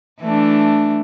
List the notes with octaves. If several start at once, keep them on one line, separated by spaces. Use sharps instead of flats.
E3 A3 D4